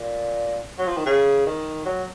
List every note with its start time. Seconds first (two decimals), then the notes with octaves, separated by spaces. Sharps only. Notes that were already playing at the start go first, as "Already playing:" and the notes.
Already playing: A#2
0.78 F#3
0.88 F3
0.97 D#3
1.06 C#3
1.47 D#3
1.85 F#3